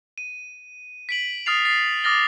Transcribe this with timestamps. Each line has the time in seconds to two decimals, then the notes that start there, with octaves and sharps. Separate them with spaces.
0.18 D#7
1.09 B6 D7 F#7
1.46 D#6 F6 A6 C7 F7
1.65 A6 C7
2.04 D6 D#6 F6 A6 A#6 G7